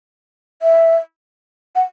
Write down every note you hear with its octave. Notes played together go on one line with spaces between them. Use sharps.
E5
F#5